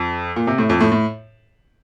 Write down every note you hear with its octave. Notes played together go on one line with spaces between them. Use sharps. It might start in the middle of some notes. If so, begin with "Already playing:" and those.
Already playing: F2
A#2
C3
A2
F2
A2
A2